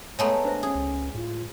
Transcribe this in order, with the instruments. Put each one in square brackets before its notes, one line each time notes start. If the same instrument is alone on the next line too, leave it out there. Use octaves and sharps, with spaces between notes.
[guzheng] G#3 A3 B3 [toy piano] C#5 [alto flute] A#5
[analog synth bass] D4 [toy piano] B4 C5 E5
[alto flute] C#4 [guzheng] G#4
[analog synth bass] C#2
[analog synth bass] A2 [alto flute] F4